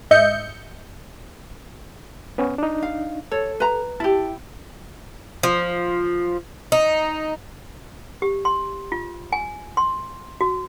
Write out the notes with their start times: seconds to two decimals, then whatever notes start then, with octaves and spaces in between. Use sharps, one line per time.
0.11 G#2 D#5 E5 G6 C#7
2.38 B3 C#4
2.58 D4 D#4
2.82 F5
3.32 A4 C#5
3.60 B4 A#5
4.00 E4 G4 A5
5.43 F3
6.72 D#4
8.22 G4
8.45 C6
8.92 F4
9.32 G#5
9.77 C6
10.41 F#4